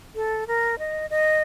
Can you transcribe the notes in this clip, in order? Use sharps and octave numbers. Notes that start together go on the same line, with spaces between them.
A4
A#4
D#5
D#5